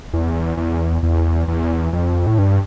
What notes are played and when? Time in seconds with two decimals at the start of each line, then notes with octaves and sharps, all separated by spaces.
0.13 E2
0.57 E2
1.03 E2
1.48 E2
1.93 F2
2.27 A2
2.38 G2